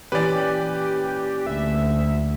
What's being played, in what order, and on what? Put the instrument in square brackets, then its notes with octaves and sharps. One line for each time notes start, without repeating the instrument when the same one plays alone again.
[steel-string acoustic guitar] A#2 E3 C#4 [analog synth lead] G4 [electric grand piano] B4 D5
[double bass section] D2 [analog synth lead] E5